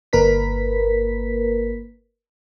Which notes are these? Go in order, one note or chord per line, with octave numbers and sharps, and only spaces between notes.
G1 A#3 A#4 B4 B6